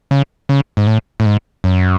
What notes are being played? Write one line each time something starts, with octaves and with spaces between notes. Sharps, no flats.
C#3
C#3
G#2
A2
A2
G#2
F#2